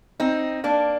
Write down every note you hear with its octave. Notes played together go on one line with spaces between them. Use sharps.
C4 D#4
A#3 D4